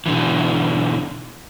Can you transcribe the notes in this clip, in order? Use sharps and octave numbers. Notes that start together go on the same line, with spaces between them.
B2 D3 E3